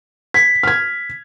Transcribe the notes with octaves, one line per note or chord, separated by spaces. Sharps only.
G#6 B6
F6 G#6